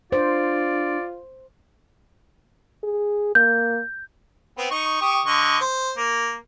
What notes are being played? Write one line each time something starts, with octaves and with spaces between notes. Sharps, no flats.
D4 F4 C5 D5
G#4
A#3 G6
B3 C4
D#4 C#6
G4 C#6 D#6
D3 D#5 C#6
C5
A#3